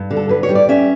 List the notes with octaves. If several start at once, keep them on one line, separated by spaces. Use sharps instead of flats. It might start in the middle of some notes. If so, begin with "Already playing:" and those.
Already playing: G2
D3
A4
G2 B4
C#5
G3
D5
C#4 E5